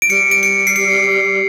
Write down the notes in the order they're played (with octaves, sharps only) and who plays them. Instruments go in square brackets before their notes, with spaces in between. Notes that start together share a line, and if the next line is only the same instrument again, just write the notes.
[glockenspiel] D7
[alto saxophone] G3 [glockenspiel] C#7
[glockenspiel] D7
C#7
C7
C#7